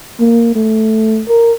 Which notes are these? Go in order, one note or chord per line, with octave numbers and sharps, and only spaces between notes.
A#3
A3
A#4